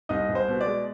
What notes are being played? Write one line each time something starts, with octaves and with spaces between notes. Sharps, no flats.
C2 D#4 D#5
C2
C5
B2
D5
G#3